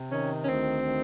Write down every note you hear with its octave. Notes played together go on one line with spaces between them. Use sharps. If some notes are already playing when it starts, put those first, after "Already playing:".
Already playing: C3
D#3 C#4
C#4
D2 C4
D#3